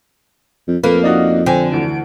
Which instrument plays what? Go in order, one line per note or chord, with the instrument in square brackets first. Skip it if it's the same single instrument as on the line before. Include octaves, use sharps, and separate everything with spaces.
[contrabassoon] F2
[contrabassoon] F2 [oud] A#3 [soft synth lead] A4 [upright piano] B4
[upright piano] D4 D#4 F#4 [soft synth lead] D#5
[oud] D3 [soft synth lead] C5 [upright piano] G5 G#5
[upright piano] D2 E3 [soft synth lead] D7